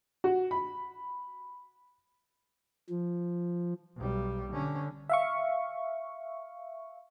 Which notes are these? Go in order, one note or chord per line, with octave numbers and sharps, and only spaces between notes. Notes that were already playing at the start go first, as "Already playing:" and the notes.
F#4
B5
F3
B1 G3
D3 C#4
E5 F5 C#6